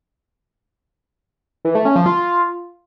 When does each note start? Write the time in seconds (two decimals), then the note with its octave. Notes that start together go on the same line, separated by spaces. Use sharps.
1.65 E3
1.75 A3
1.85 C#4
1.96 F3
2.06 F4